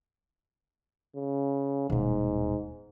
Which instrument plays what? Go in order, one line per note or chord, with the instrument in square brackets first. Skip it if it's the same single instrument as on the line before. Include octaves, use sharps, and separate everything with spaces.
[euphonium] C#3
[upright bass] D#1 B2 [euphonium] G#2